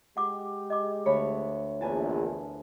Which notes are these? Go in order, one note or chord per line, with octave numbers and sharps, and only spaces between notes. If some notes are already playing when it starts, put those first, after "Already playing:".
G#3 G4 F#5 D6
D#5 D6
D2 C#5 B5
A#1 E2 E4 B4 G#5 A5